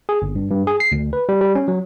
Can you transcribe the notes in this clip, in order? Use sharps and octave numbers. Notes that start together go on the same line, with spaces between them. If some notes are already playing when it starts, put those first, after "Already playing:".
G#4
G1
G2
G2
G#4
C7
D2
B4
G3
G3
C#4
F#3